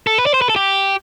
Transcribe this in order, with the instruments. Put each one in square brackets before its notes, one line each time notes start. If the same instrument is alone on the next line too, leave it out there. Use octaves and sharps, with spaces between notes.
[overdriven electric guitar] A4
B4
D5
C5
B4
A4
G4